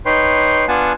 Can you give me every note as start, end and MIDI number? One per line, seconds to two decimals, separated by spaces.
0.06 0.65 63
0.06 0.65 71
0.06 0.65 73
0.06 0.65 79
0.06 0.65 84
0.68 0.92 59
0.68 0.92 62
0.68 0.92 65
0.68 0.92 78
0.68 0.92 80
0.68 0.92 81